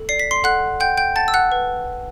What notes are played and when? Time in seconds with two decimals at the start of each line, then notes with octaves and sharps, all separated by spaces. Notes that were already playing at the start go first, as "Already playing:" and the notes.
Already playing: A4
0.09 D5 C7
0.19 B6
0.31 C6 C7
0.44 A4 F#5 F#6
0.80 F#5 G5 G6
0.97 G5 G6
1.16 F#5 A5 A6
1.28 E6
1.34 F#5 F#6
1.52 B4